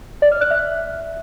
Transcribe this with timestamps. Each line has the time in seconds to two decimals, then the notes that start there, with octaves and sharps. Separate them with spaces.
0.22 D5
0.32 F6
0.41 F#6
0.50 E5